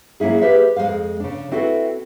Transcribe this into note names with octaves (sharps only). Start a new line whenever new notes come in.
F#3 A#3 C#4 E4 G#4
G4 G#4 B4 C5 E5
F2 G#3 B4 C5 F5
C#3 D4
C4 E4 F#4 A4 B4